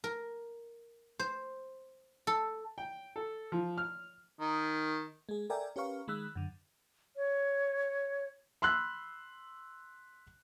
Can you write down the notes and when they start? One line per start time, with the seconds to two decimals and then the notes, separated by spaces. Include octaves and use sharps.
0.04 A#4
1.19 C5
2.27 A4
2.78 G5
3.16 A4
3.52 F3
3.78 F6
4.39 D#3
5.29 G#3 G#4
5.50 A4 A#4 D5 E5 G5 G#5
5.76 C#4 G4 A#4 B4 F5 C#6
6.08 D#3 G#3 B5 E6 F#6
6.36 F#2 D3
7.17 C#5
8.62 B5 C6 E6 F#6